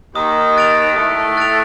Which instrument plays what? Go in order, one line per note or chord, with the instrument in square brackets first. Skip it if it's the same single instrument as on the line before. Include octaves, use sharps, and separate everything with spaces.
[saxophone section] D#2 D#3 [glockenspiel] D#6
[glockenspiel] F#6 A6 D7 F7
[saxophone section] A2 A3 [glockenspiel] D#6
[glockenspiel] F#6 A6 D7 F7